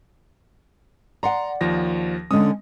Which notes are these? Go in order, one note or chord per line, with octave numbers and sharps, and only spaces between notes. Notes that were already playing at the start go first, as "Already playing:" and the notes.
D5 F#5 A#5 C6
D#2 F3 A#6
D3 G#3 C#4 D#6